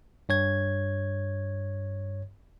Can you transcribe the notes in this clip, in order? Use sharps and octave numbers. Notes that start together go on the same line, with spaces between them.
G2 C#5 G#6